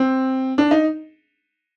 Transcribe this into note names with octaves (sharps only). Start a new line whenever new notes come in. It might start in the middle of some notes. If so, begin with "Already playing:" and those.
Already playing: C4
D4
D#4